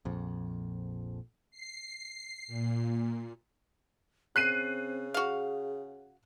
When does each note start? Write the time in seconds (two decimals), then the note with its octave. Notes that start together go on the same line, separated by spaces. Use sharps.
0.05 A#1 F2
1.51 C7
2.47 A#2
4.36 C#3 C4 F#6 C7 D#7
5.14 F#4 G#4 F5